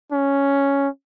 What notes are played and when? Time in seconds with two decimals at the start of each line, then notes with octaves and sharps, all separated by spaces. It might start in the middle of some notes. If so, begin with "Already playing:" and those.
0.12 C#4